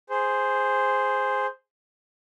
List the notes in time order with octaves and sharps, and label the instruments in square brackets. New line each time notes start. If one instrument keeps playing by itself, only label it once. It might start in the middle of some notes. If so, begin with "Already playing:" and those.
[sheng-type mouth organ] G#4 C5